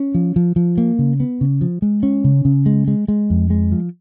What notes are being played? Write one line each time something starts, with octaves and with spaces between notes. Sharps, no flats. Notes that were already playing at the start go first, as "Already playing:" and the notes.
Already playing: C#4
F3
F3
F3
A#3
C#3
B3
C#3
F3
G#3
C#4
C#3
C#3
G#3
G#3
G#3
F2
G#3
F3